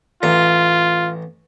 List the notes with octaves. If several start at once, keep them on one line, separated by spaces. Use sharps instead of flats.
A1 F4 A#5